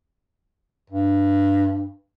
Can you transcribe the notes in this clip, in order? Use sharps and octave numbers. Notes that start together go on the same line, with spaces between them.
G2